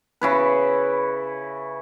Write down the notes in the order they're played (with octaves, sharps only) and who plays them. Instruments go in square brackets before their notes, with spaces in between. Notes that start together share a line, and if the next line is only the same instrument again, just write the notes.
[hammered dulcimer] C#3 E4 B4